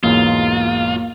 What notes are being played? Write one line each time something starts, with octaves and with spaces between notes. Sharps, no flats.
B1 E2 G#2 A#3 F4